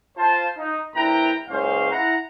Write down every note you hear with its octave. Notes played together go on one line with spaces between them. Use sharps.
F4 C5 A5
D#4
A#1 E4 A#4 B4 G5 A#5
F#1 C#2 F#2 C#4 C5 F5
E4 F#5 A#5